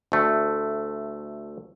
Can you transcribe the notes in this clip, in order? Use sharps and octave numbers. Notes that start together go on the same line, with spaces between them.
D2 A3